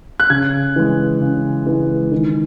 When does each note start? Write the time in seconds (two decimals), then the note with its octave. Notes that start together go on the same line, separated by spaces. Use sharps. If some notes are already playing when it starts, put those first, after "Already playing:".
0.20 F#6
0.30 C#3 G#6
0.76 E3 G#3
1.21 C#3
1.67 E3 G#3
2.12 D#3